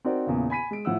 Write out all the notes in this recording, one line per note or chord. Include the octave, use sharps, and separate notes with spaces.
C4 D#4 F#4 A#4 C5 D5
E2 A#2 C#3
G#5 B5 B6 D#7
G#3 D7
A2 F3 F#5 E6